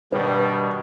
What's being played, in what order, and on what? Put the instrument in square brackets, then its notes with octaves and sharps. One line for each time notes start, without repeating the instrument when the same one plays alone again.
[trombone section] G2 G3 [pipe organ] B2 D#3 [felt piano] B4